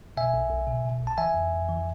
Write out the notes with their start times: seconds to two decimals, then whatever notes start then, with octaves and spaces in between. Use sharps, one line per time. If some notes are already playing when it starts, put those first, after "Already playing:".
0.17 B2 E5 G#5
0.34 B1
0.50 B1
0.67 B2
0.85 B2
1.00 B1
1.07 A5
1.18 E3 E5 G#5
1.34 F2
1.52 F2
1.69 E3